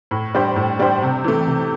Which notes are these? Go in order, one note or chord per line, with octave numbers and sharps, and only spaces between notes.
A2
G3 D4 G4 C5
A2
G3 D4 G4 C5
C3
E3 A3
C3